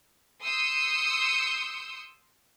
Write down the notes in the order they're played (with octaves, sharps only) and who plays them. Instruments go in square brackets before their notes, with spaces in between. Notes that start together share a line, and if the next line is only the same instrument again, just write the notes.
[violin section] C6 D#6 E6 G6 C#7